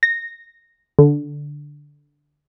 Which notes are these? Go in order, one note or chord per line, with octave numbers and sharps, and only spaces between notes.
A#6
D3